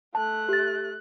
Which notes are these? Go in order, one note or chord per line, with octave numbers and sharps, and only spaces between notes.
A3 A5 F#6
G4 A6